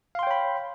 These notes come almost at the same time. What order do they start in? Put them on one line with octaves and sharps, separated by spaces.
F5 C6 G5 C#5 B5